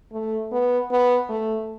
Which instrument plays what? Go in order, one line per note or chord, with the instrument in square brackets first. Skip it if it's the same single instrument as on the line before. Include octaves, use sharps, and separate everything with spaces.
[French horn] A3
B3
B3
A3